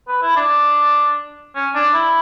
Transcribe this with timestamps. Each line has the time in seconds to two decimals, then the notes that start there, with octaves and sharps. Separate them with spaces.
0.08 B4
0.22 E4
0.37 D4
1.55 C#4
1.75 D4
1.94 E4